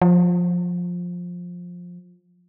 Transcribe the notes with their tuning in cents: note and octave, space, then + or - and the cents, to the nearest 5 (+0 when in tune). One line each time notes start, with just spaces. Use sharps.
F3 +15